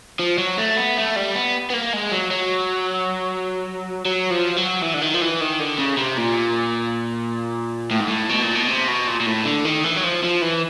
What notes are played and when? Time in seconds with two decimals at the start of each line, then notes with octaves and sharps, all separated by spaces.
0.19 F3
0.38 F#3
0.58 A3
0.77 B3
0.97 A3
1.16 G3
1.35 B3
1.70 B3
1.74 A#3
1.93 G#3
2.12 F#3
2.31 F#3
4.06 F#3
4.31 F3
4.57 F#3
4.82 E3
4.94 D3
5.01 D#3
5.14 F3
5.21 E3
5.41 D#3
5.59 D3
5.79 C#3
5.98 C3
6.18 A#2
7.91 A2
8.00 G#2
8.08 A2
8.29 B2
8.42 A#2
8.55 B2
8.68 C3
8.88 B2
9.07 A#2
9.20 A#2
9.26 A2
9.45 D3
9.65 D#3
9.84 E3
9.96 F#3
10.04 F3
10.23 F3
10.41 E3